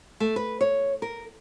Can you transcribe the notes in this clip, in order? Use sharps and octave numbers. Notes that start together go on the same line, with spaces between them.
A3
B4
C#5
A#4